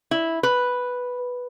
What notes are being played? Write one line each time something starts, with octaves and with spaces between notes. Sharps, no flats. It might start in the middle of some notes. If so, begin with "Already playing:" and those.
E4
B4